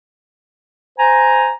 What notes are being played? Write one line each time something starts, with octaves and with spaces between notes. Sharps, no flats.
C5 G#5 A#5